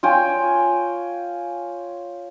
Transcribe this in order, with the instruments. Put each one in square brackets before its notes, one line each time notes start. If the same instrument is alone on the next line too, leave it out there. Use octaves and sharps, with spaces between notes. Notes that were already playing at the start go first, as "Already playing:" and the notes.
[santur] F4 C#5 G5 G#5